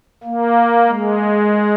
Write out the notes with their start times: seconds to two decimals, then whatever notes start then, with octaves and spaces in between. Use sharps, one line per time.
0.23 A#3
0.88 G#3